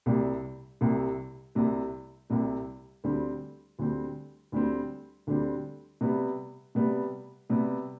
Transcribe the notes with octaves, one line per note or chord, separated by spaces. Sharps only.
C2 C3 G3
C2 C3 G3
C2 C3 G3
C2 C3 G3
D2 D3 G3 C4
D2 D3 G3 C4
D2 D3 G3 C4
D2 D3 G3 C4
C3 G3 B3
C3 G3 B3
C3 G3 B3